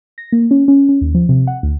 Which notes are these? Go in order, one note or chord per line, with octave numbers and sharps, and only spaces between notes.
A#6
A#3
C#4
C#4
C#4
D#2
F3
C3
F#5
D2